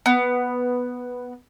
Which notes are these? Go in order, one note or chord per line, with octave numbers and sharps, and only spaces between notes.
B3